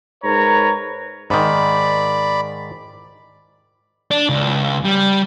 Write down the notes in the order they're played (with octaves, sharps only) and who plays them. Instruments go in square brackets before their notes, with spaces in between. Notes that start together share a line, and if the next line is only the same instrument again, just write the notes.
[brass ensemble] G#2 A#4 B4 C#5 A#5
[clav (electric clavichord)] G#2 D#3 [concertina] D5 B5
[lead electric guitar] D4
C#2
G3